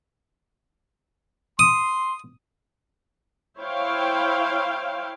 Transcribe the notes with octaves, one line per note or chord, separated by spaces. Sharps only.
C6 D#6
E4 C5 C#5 F5 G5